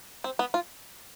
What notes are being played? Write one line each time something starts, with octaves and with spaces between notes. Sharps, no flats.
C4
B3
F4